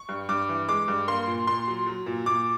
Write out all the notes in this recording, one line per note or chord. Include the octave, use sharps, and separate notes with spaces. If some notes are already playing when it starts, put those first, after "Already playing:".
Already playing: C#6
G2
G2 D6
E3
G#3 D6
G2
A#3 C6
A#2
A#2 C6
F#3
F#3
A#2
A#2 D6